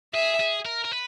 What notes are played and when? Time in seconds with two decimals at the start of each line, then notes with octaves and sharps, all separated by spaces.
0.14 G#4 E5
0.40 G#4
0.65 A#4
0.85 A#4
0.91 B4